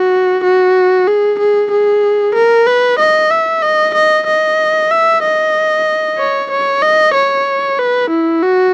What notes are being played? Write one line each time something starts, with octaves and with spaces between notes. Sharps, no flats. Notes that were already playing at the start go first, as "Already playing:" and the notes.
Already playing: F#4
F#4
G#4
G#4
G#4
A#4
B4
D#5
E5
D#5
D#5
D#5
E5
D#5
C#5
C#5
D#5
C#5
B4
E4
F#4